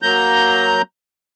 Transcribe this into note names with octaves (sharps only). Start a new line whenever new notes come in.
F#3 A#3 A#5 G6